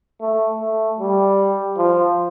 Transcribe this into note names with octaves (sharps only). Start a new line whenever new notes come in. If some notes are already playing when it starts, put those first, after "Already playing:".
A3
A3
G3
F3